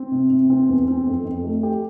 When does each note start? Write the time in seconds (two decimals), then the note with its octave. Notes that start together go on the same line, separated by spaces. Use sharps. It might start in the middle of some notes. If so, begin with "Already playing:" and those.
Already playing: C4
0.12 C3
0.30 C3
0.50 C4
0.69 E2
0.88 C4
1.07 F2
1.25 F2
1.44 A3
1.63 G4